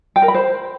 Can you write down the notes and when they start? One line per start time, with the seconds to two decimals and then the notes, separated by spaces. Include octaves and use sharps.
0.16 G5
0.22 A#4
0.28 B5
0.35 C5